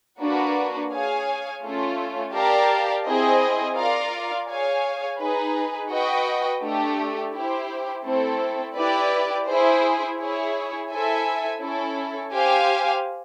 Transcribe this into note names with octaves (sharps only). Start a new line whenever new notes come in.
A#3 D4 F#4 B4
G#4 C#5 F5 G#5
A3 C#4 F4
G4 A#4 D5 F5 A5
C4 E4 G#4 C5 D#5
F4 A#4 D5 F5
G#4 C#5 F5 G#5
D#4 G#4 B4
F#4 B4 D#5 G5
A3 D4 G4
E4 G4 C5
A3 C4 E4 A4
E4 G4 B4 D5
E4 G#4 C5
E4 G#4 C#5
E4 A4 C5 E5 G#5
C#4 E4 A4
G4 C5 F5 G#5